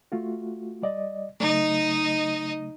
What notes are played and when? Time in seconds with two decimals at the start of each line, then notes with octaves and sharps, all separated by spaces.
0.12 A3 F4 F#4
0.82 G3 D5 D#5
1.40 C#3 F#3 A3 D#4 D#5